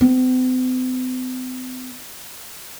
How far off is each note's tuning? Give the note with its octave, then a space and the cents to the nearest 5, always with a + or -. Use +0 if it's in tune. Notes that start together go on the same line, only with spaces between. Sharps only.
C4 -45